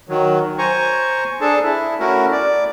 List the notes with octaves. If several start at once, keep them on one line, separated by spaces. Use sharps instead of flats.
D#3 F#3
C5 G#5 A#5 C#6
D4 G#4 A4 A5
E4
A3 C#4 E4 F#4 A#4
D5